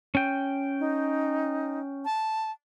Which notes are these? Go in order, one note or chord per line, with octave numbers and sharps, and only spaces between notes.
C#4 G5
D#4
A5